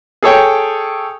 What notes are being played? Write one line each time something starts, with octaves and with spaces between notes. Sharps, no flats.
G#4 A4 C#5 G5